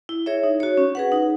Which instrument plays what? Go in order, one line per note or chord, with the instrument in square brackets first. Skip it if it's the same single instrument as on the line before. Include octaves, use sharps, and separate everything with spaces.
[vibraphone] E4
G#4 C#5 E5
D#4
F#4 C#5
C#4
G#4 B4 F#5
D#4